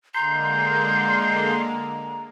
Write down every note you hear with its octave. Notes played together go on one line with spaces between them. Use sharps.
D3 G#3 A#3 A#5 C6 G6